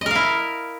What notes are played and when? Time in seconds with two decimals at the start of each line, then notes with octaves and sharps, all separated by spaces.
0.01 D#5
0.06 A#4
0.11 F5
0.15 E4